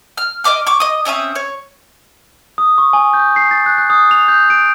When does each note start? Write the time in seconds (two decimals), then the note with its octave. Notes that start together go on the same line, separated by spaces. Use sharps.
0.17 F6
0.44 D#5 E5 D6 F6
0.66 C#6 D6
0.80 D#5 D#6
1.05 C4 C#4 E5 D#6
1.35 C#5
2.58 D#6
2.78 C#6
2.93 G#5
3.14 G6
3.36 C7
3.51 A6
3.66 F#6
3.78 F#6
3.90 D#6
4.11 F7
4.28 G6
4.50 D7